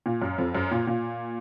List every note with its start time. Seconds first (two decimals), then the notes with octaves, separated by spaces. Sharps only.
0.06 A#2
0.22 F#2
0.38 F2
0.55 F#2
0.71 A#2
0.87 A#2